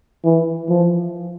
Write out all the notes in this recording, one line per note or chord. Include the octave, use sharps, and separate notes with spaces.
E3
F3